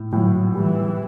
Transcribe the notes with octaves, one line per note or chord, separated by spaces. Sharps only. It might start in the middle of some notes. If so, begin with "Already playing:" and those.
Already playing: A2
A2 F#3
E3 G3